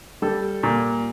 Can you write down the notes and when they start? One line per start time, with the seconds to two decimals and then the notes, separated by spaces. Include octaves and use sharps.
0.22 G3 A4
0.63 A#2